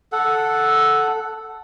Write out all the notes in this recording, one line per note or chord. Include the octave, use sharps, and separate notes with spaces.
A4 F#5